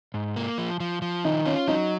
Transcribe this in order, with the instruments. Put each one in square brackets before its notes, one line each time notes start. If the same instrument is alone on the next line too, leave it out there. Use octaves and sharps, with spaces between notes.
[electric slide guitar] G#2
A#3
F3
F3
F3
[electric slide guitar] D#3 [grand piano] D#4
[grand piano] C#4 [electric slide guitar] F4
[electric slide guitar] F#3 [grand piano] D#4